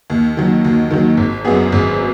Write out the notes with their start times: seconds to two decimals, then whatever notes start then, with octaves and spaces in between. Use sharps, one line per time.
0.10 D#2
0.37 D#3 F#3
0.65 D#2
0.91 D#3 F#3
1.17 G#1
1.45 F#2 F#3 B3 G#4
1.72 G#1